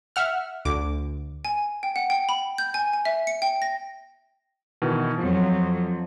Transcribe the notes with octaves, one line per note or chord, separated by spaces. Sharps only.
E5 F#5 F6
D2 D6
G#5
G5
F#5
G5
B5
G6
G#5
G#5
E5
C#7
G5
A#6
B2 D#3 E3
F2 F3 F#3